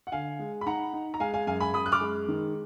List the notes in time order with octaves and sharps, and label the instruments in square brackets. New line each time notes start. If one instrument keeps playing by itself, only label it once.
[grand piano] F#5
D3 F5 G#5
G#3
B5
D#4 F#5 A#5
D#4
A#5
G#3 F5 G#5
F5 G#5
F#2 F5 G#5
G#5 B5
F#2 B5 D#6
F#6
D6 F6
G#3
D#3